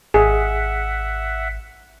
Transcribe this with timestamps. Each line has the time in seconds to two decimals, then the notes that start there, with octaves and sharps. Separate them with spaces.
0.14 G#1 G#4 E5 F#5